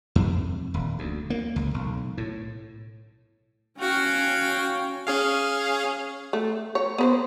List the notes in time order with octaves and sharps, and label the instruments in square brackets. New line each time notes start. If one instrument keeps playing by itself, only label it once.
[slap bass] F2
D#1
D2
A#3
C#2
B1
A2
[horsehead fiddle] C#4 [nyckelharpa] F#4 [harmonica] F5 G5
[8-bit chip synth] C#4 G#4 F5
[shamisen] A3
C#5
B3 B4 C5